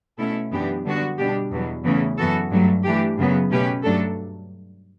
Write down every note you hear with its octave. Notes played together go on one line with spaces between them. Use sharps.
B2 A3 C#4 E4 A4
F#2 E3 B3 D4 G4
D3 G3 B3 D4 F#4
B2 G3 D4 G4
E2 B2 F#3
E2 C#3 E3 A3 C#4
F#2 E3 B3 F#4 A4
G2 F#3 A3
E3 A3 D4 G4
F#2 C#3 F#3 B3
B2 A3 C#4 G4 B4
G2 F#3 A3 D4 A4